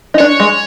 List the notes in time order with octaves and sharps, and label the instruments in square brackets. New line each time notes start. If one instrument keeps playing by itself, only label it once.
[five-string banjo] D#4
[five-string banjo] D4 [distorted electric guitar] C#5
[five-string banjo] G#3